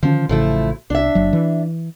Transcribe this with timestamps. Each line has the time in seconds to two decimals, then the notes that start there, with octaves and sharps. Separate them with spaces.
0.03 D3 D#3 F3 C#4
0.29 A1 C#3 F3 A3 E4
0.90 C2 D4 E5
1.15 F#1 F#3
1.33 E3